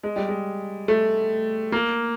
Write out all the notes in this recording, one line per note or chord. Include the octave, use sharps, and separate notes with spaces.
G#3
G3
G#3
A3
A#3